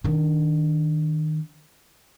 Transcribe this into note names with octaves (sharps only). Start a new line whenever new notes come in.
D#3 D4